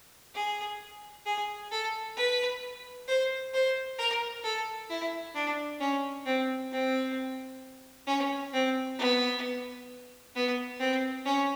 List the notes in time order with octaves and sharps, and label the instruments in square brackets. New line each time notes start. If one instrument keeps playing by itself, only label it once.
[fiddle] G#4
G#4
A4
B4
C5
C5
A#4
A4
E4
D4
C#4
C4
C4
C#4
C4
B3
B3
C4
C#4